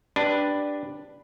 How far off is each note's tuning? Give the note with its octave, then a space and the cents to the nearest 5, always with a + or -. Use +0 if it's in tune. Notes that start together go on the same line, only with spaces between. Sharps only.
D4 +0 G4 +0 B4 +0